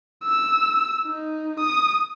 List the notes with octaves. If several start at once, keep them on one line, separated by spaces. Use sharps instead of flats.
E6
D#4
D#6